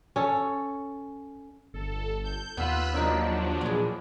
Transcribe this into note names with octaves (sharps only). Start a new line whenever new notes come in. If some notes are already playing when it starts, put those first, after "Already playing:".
C#4 A4
G1 A4
G6
D#2 B3 F4 B5 E6 F#6
F3 F#3 D4 D#4 A#4 C#5
A#2 E3 G#3